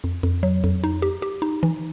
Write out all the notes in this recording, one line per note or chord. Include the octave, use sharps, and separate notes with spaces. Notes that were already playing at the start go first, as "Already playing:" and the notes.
F2
F2
F#3
F2
D#4
G4
G4
D#4
E3